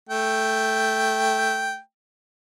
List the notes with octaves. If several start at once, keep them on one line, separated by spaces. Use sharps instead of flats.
A3 G5